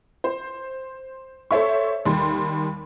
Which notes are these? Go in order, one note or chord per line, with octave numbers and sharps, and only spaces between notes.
C5
A4 C5 C#5 E5 C#6
D#2 G3 C6